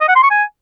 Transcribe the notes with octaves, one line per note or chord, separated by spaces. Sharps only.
D#5
F#5
C6
C#6
G#5